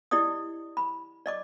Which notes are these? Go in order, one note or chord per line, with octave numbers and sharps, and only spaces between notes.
E4 G4 D5 D#5 D#6
B5
D5 D#5 D6